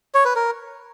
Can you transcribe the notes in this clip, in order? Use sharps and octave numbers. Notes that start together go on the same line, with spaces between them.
C#5
B4
A#4